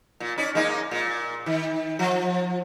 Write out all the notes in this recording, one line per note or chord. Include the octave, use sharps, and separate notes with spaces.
A#2
C#4 D#4 D5
G#3 A#3 D#4
A#2
D#3
F3